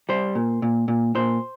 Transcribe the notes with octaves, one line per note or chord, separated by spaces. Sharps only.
G3 C5
A#2
A#2
A#2
A#2 C5